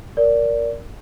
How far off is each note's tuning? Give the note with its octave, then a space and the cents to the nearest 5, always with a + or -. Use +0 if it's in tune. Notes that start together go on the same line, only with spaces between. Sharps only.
A#4 +0 D5 -20